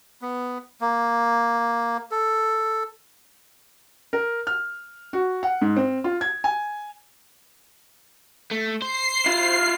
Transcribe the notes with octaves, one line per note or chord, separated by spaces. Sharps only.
B3
A#3
A4
A#4
F6
F#4
F#5
G#2
C4
F4
G#6
G#5
A3
C5 C7
E4 F4